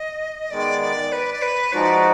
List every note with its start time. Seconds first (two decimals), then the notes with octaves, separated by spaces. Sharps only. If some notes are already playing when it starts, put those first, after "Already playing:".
Already playing: D#5
0.50 D#3 G#3 B3 D5
0.81 D5
1.12 B4
1.33 D5
1.42 B4
1.73 F3 G#3 D#4 F#4 D5